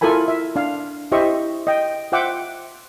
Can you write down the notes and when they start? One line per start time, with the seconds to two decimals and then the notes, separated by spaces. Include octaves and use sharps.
0.01 E4 F4 A4 A#4 G#5 B5
0.28 E5
0.56 D4 F5
1.12 E4 G4 C5 D#5 E5 C#6
1.67 D#5 G5
2.12 F4 C5 E5 F#5 G5 D6